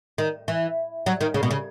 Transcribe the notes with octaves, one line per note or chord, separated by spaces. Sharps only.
D#3
E3
F#3
D#3
C#3
B2
C#3